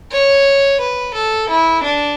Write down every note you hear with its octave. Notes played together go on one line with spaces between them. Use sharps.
C#5
B4
A4
E4
D4